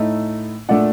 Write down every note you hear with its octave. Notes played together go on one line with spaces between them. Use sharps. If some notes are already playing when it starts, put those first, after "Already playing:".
Already playing: A2 A3 D#4
A#2 A3 D4 D5 F#5